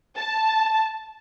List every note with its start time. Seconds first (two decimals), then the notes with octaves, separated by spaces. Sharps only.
0.16 A5